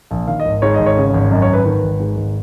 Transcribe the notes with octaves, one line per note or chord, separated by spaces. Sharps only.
A#1
D#3 F5
D#5
G#1
G#2 C#5
G#1 D#5
C#5
C#3
G#1
F#2 D#5
C#5
G#1
B4
D#3 B4
G#1
G#2
G#1